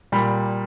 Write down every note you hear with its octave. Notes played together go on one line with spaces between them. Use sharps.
A#2 G3 B5